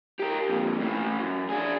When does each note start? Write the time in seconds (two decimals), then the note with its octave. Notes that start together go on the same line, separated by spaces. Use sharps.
0.20 G4 A#4
0.49 F2 A#2
0.79 A2 E3
1.19 F#2
1.50 D4 G#4